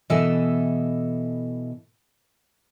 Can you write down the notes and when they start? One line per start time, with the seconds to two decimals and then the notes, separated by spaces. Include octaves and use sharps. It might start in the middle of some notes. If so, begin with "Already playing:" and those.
0.10 B2 E3 A4 D#5 E5 G#5